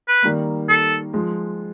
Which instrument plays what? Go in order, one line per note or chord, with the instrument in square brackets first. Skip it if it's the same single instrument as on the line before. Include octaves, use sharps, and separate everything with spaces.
[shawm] B4
[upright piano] D#3 G3 A#3
[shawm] A4
[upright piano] F3 G#3